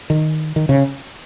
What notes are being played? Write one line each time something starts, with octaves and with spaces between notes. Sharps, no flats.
D#3
D#3
C#3